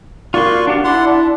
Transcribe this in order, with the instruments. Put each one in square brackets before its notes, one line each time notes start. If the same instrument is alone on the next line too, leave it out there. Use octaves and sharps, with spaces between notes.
[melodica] A#3 D5 C#6 [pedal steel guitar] F4 F#4 C6
[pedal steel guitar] D4 F#4 G4
[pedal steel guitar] E4 [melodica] D5 F#5 C6
[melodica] D4